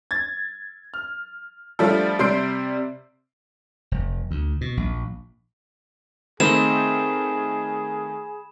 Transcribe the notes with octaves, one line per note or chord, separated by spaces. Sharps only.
G#6 A6
F6
F3 G3 A3 D4 F4
C3 G3 C6 G6 C7 D7
F1
D2
B2
A#1
D#3 A3 C4 D#4 G#4 D#5 B5 E7